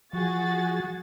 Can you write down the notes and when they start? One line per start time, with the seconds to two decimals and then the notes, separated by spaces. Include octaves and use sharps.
0.13 F3 F#4 G#4 A6